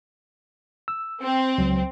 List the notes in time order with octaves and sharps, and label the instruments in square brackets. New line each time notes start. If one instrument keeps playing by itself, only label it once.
[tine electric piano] E6
[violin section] C4
[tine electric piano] C#2 F#3